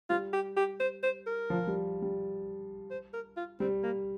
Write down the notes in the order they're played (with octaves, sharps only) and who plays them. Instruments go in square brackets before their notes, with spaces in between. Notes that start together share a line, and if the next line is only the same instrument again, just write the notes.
[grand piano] G3 [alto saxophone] F4
[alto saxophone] G4
G4
C5
C5
A#4
[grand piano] F3
G3
G3
[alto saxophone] C5
A#4
F4
[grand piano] G3 [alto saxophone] C4
[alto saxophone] A#3